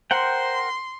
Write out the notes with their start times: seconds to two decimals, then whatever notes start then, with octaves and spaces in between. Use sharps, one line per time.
0.11 A#4 C5 F#5 G5 C6